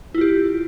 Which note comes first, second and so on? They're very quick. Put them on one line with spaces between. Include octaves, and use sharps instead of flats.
E4 F4 G4